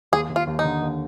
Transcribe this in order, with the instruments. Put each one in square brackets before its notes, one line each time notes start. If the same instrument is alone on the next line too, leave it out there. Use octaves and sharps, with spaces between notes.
[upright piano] D#2 [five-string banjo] G#4
[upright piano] D#2
[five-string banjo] F4
[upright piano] D#2
[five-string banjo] D#4
[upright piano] D3
D#2